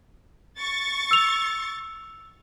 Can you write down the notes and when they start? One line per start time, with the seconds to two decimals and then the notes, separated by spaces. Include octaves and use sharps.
0.58 C#6 A6
1.11 E6 F7